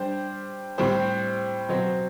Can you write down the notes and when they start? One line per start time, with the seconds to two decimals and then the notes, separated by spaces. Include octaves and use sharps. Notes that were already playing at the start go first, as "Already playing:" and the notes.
Already playing: G3 D4 G4 C5
0.78 A2 G3 C4 G4 C5
1.69 B2 F#3 C4